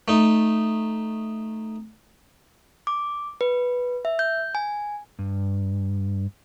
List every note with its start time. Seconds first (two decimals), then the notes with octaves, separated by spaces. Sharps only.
0.08 A3 D#4
2.87 D6
3.41 B4
4.05 E5
4.19 G6
4.55 G#5
5.19 G2